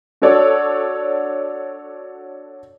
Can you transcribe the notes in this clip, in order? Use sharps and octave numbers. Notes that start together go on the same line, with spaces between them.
D4 F#4 A4 C#5 D5